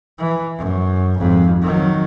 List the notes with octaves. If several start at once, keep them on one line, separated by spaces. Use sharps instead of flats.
E3
F#2
G#1 F2
D#3 F#3